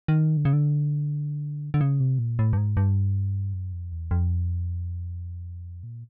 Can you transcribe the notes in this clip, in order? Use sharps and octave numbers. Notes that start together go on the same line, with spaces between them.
D#3
D3
C#3
D3
D3
C#3
C3
A#2
A2
G2
G#2
G2
F#2
F2
E2
F2
A#2